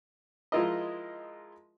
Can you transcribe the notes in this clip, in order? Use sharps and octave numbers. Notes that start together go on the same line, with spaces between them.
F3 G#3 E4 F4 A#4 D#5